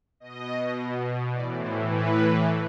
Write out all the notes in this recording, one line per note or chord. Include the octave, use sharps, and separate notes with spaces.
B2 D#5
A2 E3 D5
C5
B4